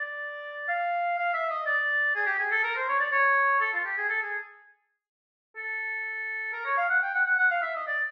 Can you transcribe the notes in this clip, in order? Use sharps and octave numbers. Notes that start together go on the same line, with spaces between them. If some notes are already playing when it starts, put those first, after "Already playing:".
Already playing: D5
F5
F5
E5
D#5
D5
G#4
G4
G#4
A4
A#4
C5
C#5
D5
C#5
A4
F4
G4
G#4
A4
G#4
A4
A#4
C#5
F5
F#5
G5
F#5
F#5
F#5
F5
E5
D#5
D5